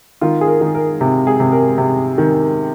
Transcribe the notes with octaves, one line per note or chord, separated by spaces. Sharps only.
D#3 F4
G#4
A#4
D#3
A#4
C3
G#4
C3
A#4
C3
D#3